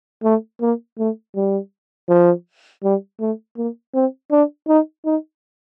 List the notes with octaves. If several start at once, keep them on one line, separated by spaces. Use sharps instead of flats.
A3
A#3
A3
G3
F3
G3
A3
A#3
C4
D4
D#4
D#4